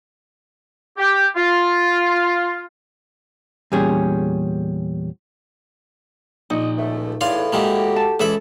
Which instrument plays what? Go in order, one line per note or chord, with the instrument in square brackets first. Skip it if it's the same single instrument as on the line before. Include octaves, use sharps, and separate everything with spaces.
[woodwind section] G4
F4
[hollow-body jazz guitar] E2 A#2 G3 C#4 G#4
[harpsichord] A#1 [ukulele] D#4 [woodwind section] D#5
[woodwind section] C#2 B2 A3
[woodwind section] E2 [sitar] A2 [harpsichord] D5 F5 C6
[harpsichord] E3 G#3 A#3 [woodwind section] F#4 G4
[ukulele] A5
[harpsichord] C#2 E5 B5 [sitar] E3 [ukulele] A4